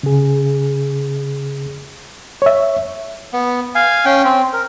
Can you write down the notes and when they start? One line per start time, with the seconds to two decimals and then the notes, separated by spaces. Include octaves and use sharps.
0.03 C#3 G#4
2.42 C#5 E5
3.33 B3
3.75 F5 G#5
4.05 C#4 G5
4.24 C4
4.53 A#4